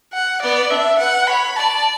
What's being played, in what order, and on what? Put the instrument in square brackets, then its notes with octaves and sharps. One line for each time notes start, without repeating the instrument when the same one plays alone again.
[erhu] F#5
[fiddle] B3 [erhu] D5
[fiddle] D4 [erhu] E5
[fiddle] B4 [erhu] F#5
[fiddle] C#5 [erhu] B5
[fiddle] D5 [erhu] A5